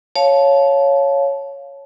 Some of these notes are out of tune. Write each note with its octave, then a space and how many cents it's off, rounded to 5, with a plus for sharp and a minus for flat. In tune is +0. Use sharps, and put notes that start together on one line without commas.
C#5 +0 F5 +0 A5 -20